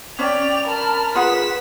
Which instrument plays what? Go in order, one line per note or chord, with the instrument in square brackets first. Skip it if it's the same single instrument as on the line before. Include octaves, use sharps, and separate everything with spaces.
[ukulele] C#4 [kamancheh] D5 G5 [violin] F7
[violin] A#4 F6 [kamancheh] A5 B5
[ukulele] F4 G#4 F#5 [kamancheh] B4 [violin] B6 E7